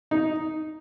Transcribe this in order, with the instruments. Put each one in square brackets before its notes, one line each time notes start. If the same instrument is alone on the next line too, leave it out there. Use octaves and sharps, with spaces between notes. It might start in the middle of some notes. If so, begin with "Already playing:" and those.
[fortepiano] D#4